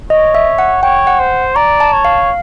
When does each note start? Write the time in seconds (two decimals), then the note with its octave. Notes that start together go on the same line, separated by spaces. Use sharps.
0.10 C#5 D#5
0.35 E5
0.59 F#5
0.83 C#5 G5
1.07 F#5
1.19 C5
1.56 D5 A#5
1.80 A5
1.92 C#5
2.05 F5